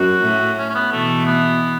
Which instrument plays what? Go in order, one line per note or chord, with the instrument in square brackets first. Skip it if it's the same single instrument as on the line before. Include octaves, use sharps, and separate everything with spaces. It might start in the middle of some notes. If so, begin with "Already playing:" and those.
Already playing: [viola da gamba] F#2 [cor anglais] F#4
[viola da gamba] A2
[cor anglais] C#4
C#4
B3
[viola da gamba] B2 E3 [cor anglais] A3
[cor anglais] B3